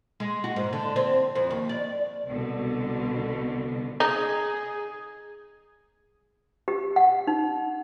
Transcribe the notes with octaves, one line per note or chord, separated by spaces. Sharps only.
G#3
F#4
G#2
D3
C4
F2
D#2
D5
C2 B2 D3
D#4 G#4
G4
F#5
D#4